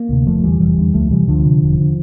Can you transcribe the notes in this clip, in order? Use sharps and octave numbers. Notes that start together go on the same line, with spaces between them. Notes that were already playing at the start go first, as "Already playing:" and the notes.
Already playing: A#3
D2 C3
F1 F3 A3
E2 D3 E3 G3
F1 E3 G3
E2 D3
D2 F3 A3
C3 E3 G3
D2 D3 F3
C3
E1
D3